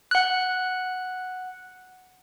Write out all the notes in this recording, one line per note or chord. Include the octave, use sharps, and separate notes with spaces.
F#5 F#6